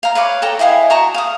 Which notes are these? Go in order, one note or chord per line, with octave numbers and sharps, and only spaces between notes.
F5 A#5
B4 C#5 F5 D6
A4 G5 A#5
E4 D#5 F5 G#5
F#4 A5 A#5 C#6
F5 D#6